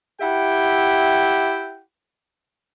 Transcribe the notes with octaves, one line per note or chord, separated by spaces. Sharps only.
E4 G4 E5 F#5 G5